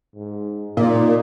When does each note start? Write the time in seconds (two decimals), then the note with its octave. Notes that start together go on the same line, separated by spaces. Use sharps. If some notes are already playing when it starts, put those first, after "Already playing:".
0.16 G#2
0.77 A#2 D#4